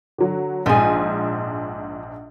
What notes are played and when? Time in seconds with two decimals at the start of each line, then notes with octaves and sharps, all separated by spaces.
0.18 D3 F#3
0.66 A#1 G#2 F3 G#4